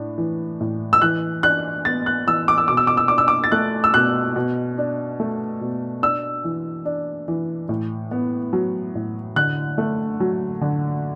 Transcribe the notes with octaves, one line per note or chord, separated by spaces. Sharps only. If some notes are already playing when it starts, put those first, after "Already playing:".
Already playing: A2 D4
E3
A2
E6
E3 F#6
D4 F#6
B3 A6
F#6
E3 E6
D6
E6
B2 D6
E6
D6
E6
D4 D6
E6
D6
A6
A3 F#6
E6
B2 F#6
B2
D4
A3
B2
D4 E6
E3
D4
E3
A2
B3
F#3
A2
D3 F#6
A3
F#3
D3